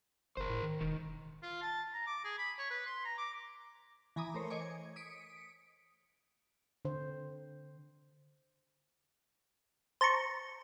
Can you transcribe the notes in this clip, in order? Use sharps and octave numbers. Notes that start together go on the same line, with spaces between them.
G1 A#4 C5
A2
D#3
E1 D#3
F4
A5
A#5
D6
G#4
B5
C#5
B4
C6
A#5
D6
E3 G#5 A#5 B5 D6 D#6
A3 A#4 C5 C#5
C#5 D#5 G#5 C#6 D6
G#6
D#6 B6 C#7 D7
D3 C5
C5 A5 A#5 C#6